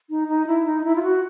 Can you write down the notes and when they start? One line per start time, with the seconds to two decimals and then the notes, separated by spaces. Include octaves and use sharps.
0.10 D#4
0.28 D#4
0.47 E4
0.65 D#4
0.84 E4
0.95 F4
1.02 F#4